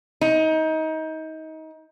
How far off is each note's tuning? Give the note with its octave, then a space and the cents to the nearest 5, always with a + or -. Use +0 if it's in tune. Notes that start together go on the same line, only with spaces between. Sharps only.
D#4 +25